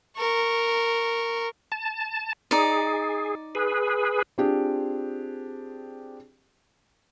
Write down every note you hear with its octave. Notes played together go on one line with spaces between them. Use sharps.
A#4 C#6
A5
D#4 G#4 D5
G#4 B4
C4 D4 F4 G4 G#4